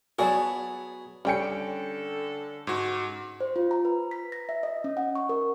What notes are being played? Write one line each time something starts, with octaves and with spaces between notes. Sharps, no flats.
F#3 B3 F#4 G#4 C#5 D5 A5
D3 G3 C#4 A4 C#5 G5 G#5 C#7
G#2 F#4
C5
F4
A#5
B4
B6
A#6
E5
D#5
C#4
F#5
C#6
A#4